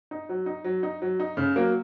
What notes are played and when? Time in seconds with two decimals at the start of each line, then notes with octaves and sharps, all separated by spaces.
0.11 D#4
0.29 F#3
0.46 D#4
0.64 F#3
0.83 D#4
1.02 F#3
1.20 D#4
1.37 C#3
1.56 F#3 A#3